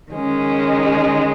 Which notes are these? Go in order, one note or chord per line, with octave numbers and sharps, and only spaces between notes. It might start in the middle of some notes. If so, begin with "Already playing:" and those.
D#3 G#3 C#4